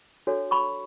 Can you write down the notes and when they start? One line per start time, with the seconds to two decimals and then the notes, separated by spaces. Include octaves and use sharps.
0.27 D4 F#4 A4 C#5
0.51 B5 C#6